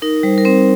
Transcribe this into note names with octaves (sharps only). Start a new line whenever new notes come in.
D#4 A#4
G3 C5
A#4
C4 C5